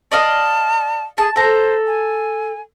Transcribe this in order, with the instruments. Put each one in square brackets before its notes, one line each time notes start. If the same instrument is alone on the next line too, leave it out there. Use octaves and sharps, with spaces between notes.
[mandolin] D5 D#5 F5 [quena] A5
[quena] G#4 [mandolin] A5
[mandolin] A4 A#5 [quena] C5
[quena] G#5